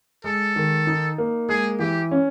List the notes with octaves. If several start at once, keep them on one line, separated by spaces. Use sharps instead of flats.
G#3 A4
D#3
D#4
A#3
G#3 G#4
E3 G4
C#4